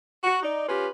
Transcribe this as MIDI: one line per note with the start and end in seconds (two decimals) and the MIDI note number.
0.23 0.42 66
0.43 0.68 63
0.43 0.68 74
0.68 0.87 61
0.68 0.87 65
0.68 0.87 67
0.68 0.87 71